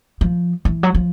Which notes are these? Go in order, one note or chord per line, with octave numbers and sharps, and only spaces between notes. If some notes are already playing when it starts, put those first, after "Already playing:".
F3
E3
F#3
F3